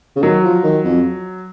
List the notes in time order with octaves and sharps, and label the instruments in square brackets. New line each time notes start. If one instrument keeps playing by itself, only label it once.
[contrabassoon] C#3
[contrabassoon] D#3 [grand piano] F#3
[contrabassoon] F3
D#3
F2